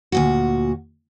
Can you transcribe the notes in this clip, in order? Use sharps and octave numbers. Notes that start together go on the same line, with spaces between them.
D2 A#2 F#4